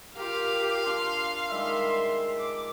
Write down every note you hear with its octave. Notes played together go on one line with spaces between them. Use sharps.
F4 G4 A#4 F5
D4 D5 C6
D#3 G3 G#3 E5 C6
D6